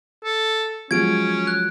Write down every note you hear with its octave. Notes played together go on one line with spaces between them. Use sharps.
A4
F3 F#3 G#3 C#4 G#6 D7
F#6